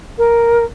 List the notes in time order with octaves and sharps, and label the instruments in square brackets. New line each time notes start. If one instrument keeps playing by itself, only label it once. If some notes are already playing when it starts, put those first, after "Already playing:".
[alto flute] A#4